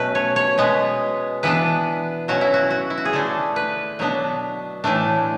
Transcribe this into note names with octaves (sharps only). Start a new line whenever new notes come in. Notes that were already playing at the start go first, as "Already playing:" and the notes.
Already playing: B2 F#3 A3 C#4 B4
C#5
C#5
B2 G#3 B3
E3 B3 D4 B4
B2 F#3 C#4 F#4
E4
F#4
F#4
E4
F#4
G#4
D3 A3 D4 A4
B4
B2 F#3 B3 D4
A2 E3 A3 D4